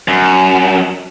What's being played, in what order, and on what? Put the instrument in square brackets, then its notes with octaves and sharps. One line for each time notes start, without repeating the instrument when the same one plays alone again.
[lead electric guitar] F#2